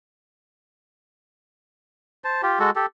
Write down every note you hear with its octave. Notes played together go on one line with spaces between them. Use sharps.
C5 A5
F4 G4
G#3 F#4 A4
G4 A4